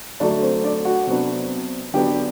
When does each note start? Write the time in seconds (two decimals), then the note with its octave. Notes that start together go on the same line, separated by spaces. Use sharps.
0.20 D3 F#3 A3 D4 D5
0.42 C4 C5
0.63 D4 D5
0.85 F#4 F#5
1.07 C3 F#3 B3 D4
1.94 D3 F#3 B3 D4 G4 G5